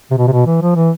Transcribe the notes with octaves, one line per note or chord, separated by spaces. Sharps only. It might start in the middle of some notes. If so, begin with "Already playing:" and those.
C3
B2
C3
B2
E3
F3
E3